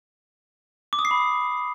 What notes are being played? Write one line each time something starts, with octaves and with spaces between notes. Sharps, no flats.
D6
D#6
C7
B5